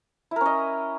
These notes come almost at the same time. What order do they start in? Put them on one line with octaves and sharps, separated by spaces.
E4 A#4 C#4 D#5